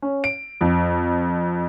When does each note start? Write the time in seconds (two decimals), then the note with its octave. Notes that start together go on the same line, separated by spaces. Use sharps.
0.02 C#4
0.24 D7
0.61 F2